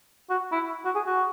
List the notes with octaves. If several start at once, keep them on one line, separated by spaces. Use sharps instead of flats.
F#4
E4
F#4
G#4
F#4